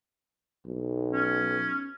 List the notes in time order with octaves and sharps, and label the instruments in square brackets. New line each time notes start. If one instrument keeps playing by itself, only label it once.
[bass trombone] B1
[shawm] C#4